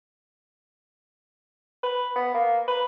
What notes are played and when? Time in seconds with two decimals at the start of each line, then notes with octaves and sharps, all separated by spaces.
1.83 B4
2.16 B3
2.34 A#3
2.68 B4